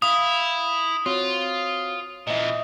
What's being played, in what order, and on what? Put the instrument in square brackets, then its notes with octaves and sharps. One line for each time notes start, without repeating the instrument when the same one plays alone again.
[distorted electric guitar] E4 [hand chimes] F5 [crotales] D#6
[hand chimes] C4 F#4 C#5 [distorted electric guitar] F4
[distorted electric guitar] A#2 E3 [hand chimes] D#5 E5